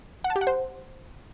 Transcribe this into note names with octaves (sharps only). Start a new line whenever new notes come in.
F#5
A5
G4
F#5
C5